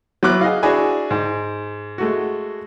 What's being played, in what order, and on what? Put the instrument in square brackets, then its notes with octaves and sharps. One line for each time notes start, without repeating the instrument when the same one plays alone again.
[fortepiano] F#3 B3 E4 D6 F#6
G#4 D#5 F5
D4 E4 F#4 G#4 G#5 B5
G#2
G#3 A3 F#4